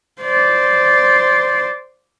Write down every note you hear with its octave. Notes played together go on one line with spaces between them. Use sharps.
C5 D5